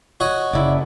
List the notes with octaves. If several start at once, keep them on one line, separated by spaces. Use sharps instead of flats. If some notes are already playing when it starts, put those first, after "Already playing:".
F#4 C#5 D#5
F#1 C#3 E4 D5